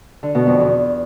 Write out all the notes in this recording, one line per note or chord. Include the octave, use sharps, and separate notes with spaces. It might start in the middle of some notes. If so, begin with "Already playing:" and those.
D3
B2
F2
E2